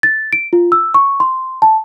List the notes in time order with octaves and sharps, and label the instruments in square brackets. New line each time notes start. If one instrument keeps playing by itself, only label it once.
[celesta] A6
D7
F4
E6
C#6
C6
A5